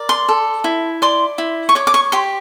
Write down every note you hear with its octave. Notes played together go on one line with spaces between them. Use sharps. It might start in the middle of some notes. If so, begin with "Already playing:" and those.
Already playing: A#4 D5
C6
A4
E4
D5 C6
E4
C#6
C#5 D6
D6
C#6
G4 C6